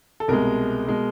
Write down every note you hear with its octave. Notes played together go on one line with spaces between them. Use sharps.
A4
C2 B2 G#3 A#4
B2 G#3